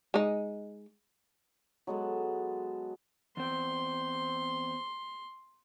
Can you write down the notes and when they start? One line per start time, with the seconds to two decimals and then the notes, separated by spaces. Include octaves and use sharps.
0.14 G#3 D#4
1.87 F#3 G#3 B3 A4
3.37 E2 C4 C6